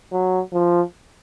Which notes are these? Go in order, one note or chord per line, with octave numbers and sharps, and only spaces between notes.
F#3
F3